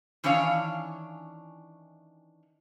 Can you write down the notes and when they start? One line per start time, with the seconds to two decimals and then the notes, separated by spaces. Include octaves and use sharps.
0.24 D#3 E3 C#4 D4 C#5 F5